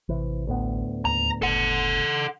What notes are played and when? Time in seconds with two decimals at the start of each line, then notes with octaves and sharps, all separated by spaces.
0.09 A1 C3 E3
0.47 D2 A2 B3
1.05 D#2 A#5
1.42 F#1 A4 F#5